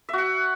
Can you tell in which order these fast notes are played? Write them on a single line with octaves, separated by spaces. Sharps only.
E5 F#4 F#5